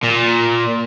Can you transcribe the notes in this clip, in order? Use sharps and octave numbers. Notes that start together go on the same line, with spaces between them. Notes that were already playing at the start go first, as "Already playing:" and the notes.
A#2